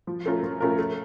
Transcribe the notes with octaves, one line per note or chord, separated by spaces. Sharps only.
F3
A3 C#4 F4 A#4
F3
A3 C#4 F4 A#4
A3